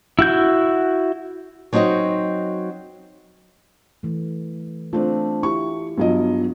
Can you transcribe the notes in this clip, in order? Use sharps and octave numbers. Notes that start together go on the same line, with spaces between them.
E4 F#4 G6
F#3 C4 D#4 F#4 D#5
E3 A3
A3 C4 D4 F4
E4 G4 C#6
G2 F#3 B3 F4 D#5